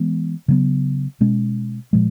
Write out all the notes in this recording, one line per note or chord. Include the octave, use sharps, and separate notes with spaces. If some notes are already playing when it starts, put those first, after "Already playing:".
Already playing: E3 G#3 B3
C#3 F#3 B3
B2 G#3 C#4
A#2 F3 G#3